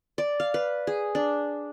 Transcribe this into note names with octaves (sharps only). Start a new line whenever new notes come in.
D5
F5
B4
G#4
D4